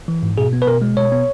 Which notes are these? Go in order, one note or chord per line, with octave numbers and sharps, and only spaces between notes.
E3
G#2
B2 G#4
B3
B4
B2 A#4
G#3
B2 C#5
B3